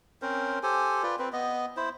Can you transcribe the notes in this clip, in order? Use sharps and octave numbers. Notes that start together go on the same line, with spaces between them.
C4 C#4 A#4 C5
G4 A4 C5 G#5
F4 B4 D5
C4 B4
B3 D#5
E4 C5